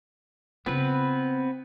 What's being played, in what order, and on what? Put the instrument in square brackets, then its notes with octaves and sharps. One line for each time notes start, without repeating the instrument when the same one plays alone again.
[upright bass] C#3 F4 [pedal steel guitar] B3 C4 B4